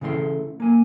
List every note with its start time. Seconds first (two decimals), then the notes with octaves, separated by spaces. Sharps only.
0.01 C#3 E3 A3 F5 C6
0.60 A#3 G#5